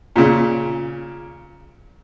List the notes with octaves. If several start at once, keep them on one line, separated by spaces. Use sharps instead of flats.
A#2 C#3